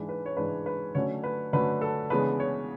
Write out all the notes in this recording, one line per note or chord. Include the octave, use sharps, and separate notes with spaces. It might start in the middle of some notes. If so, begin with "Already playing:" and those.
Already playing: G#2 E3 G#3 D4
B4
C#5
G#2 E3 G#3 D4 B4
B4
D3 F#3 A3 C#4 C#5
B4
D3 F#3 A3 C#4 B4
A4
C#3 E3 G#3 B3 D4 B4
C#5